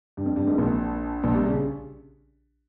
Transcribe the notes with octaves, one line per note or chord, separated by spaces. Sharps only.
G2
F2
G2
G#1 G#2
A#1 A#2
A#1 A#2
C2 C3
C#3